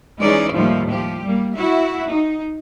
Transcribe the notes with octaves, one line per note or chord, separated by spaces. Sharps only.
E3 G#3 C#4 D#4 G#4 D5
D#2 A2 F3 G3 A3 A#3
F3 G4
G3 A#3
E4 F#4 E5
D#4